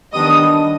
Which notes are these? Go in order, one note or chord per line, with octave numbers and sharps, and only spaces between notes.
D#3 G3 B3 D4 D#5 D#6